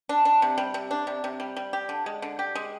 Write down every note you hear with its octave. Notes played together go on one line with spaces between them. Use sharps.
D4
D4
C3
G3
C3
D4
C3
C3
G3
G3
G4
D3
G#3
D3
G4
G#3